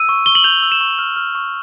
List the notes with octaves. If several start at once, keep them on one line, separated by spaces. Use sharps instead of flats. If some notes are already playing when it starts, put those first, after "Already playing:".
Already playing: E6 D#7
C#6
C#6 G7
F#7
G6 F7
E6
E7
C#6
F6
F6
C#6